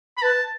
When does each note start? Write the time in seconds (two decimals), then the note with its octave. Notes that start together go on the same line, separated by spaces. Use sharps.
0.17 B5
0.22 B4 A5